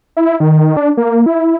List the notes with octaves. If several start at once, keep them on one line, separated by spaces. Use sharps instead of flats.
E4
D#3
D4
A#3
E4